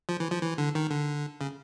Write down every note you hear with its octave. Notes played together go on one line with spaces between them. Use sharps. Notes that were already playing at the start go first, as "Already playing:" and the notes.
F3
E3
F3
E3
D3
D#3
D3
C#3